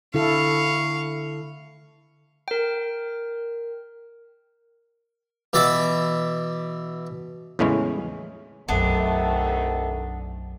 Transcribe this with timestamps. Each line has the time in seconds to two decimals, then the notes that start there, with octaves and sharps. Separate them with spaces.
0.14 D3 E4 A4 F5 C#6
2.48 A#4 G5
5.53 B2 E3 D5 E5 D6
7.59 E2 A2 C#3 E3 G#3 C#4
8.68 B1 F#2 C3 D#3 A3 B3 D4